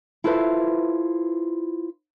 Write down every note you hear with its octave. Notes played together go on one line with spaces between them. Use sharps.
E4 F4 A4 B4 C5 E5